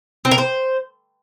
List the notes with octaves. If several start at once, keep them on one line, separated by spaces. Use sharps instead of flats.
C4
A#4
C5